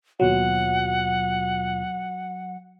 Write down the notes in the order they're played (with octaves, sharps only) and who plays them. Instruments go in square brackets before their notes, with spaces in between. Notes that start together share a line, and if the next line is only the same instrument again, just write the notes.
[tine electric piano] D#2 B2 F4 [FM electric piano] F#3 [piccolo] F#5